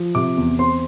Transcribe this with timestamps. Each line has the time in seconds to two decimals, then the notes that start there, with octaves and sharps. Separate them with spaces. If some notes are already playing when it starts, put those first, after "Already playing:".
Already playing: F3
0.15 C3 D6
0.37 E2
0.59 C4 C6